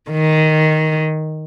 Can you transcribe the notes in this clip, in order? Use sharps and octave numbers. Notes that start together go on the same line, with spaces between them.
D#3